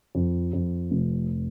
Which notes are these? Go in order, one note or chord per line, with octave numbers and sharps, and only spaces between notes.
F2
F2
F1